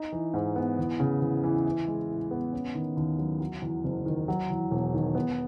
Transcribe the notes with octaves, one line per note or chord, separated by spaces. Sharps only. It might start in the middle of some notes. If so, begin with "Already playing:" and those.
Already playing: D#4
E3
G#2
B3
E2
C#3
E2
E3
E4
G#3
A2
B3
C#4
D#3
D#2
F#3
F#3
E2
F#1
D#3
F#3
E2
E1
D#3
B3